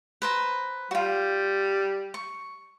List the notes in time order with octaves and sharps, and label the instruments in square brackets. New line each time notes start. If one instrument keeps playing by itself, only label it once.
[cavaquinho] B4 C5 A#5
[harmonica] G3 [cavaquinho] F4 F#4
[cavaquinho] C#6